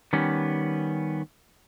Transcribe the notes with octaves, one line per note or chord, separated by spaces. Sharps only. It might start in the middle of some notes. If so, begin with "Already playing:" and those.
D#3 G3 B3 C#4